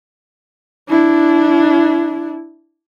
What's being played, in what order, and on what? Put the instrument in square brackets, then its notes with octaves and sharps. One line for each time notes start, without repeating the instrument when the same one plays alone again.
[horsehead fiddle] D4 E4